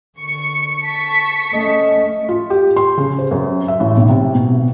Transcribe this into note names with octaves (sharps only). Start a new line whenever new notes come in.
D3 C#6 C#7
A5 C#6 B6
A3 C#4 D#5
F4
G4
C6
C#3
C5
F#2
E5
A1
B1
C3
B2